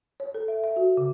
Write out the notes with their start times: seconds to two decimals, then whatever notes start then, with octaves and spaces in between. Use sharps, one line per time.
0.20 C#5
0.34 A4
0.48 E5
0.64 E5
0.76 F#4
0.97 C#3